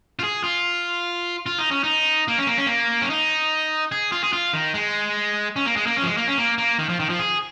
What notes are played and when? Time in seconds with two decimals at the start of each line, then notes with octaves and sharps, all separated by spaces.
0.19 F4
0.24 G#4
0.44 F4
1.46 F4
1.58 D#4
1.71 C#4
1.84 D#4
2.28 A#3
2.38 C#4
2.47 A#3
2.57 C#4
2.66 A#3
3.02 C#4
3.10 D#4
3.92 G#4
4.12 F4
4.24 G#4
4.33 F4
4.54 D#3
4.74 G#3
5.56 C#4
5.66 A#3
5.76 G#3
5.86 A#3
5.97 C#4
6.03 F3
6.07 G#3
6.17 A#3
6.28 C#4
6.38 A#3
6.58 A#3
6.79 D#3
6.89 F3
7.00 D#3
7.09 F3
7.19 G#4